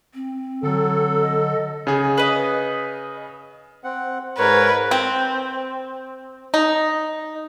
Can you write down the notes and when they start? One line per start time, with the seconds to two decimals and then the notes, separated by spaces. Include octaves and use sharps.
0.14 C4
0.63 D3 F#3 A4
1.21 D#5
1.87 C#3 G#4
2.18 B4 D#5
3.84 C4 F#5
4.38 G#2 A#4 B4 C#5
4.91 C4
6.54 D#4